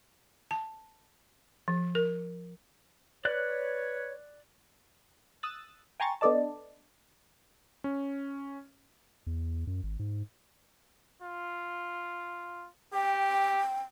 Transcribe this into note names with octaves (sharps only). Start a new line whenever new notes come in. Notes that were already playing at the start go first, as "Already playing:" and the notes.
A5
F3
A#4
B4 C#5 D5 F#6
D#6 E6 F#6 A6
G5 G#5 A#5 C6 C#6 A6
B3 D4 A4 D5 D#5 A5
C#4
E2
F#2
G#1
G#2
F4
G4 G5